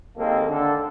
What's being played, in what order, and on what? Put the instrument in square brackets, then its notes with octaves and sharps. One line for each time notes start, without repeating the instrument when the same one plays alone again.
[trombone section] D#2 G#2 D#3 A#3 C4 A4
D3 A4